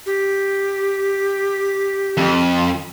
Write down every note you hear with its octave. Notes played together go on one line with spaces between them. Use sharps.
G4
F2